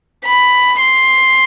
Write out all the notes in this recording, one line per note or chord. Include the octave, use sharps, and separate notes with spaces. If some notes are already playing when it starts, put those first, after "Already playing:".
B5
C6